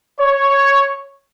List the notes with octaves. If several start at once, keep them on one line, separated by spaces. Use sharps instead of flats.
C#5